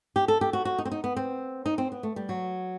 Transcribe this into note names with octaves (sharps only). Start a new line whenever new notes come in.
G4
A4
G4
F#4
F#4
D#4
C4
D#4
B3
C4
D#4
C4
B3
A3
G3
F#3